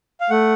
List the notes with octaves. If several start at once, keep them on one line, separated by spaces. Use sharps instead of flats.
F5
A3 F#5